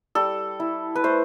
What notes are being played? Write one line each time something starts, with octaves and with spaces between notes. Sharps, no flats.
G3 A4
E4
B4
A3 C5